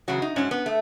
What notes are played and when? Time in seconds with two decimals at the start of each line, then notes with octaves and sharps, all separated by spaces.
0.08 E2 C#3 F#3 F#4
0.22 D#4
0.36 G#2 F#3 C#4
0.51 B3
0.66 A3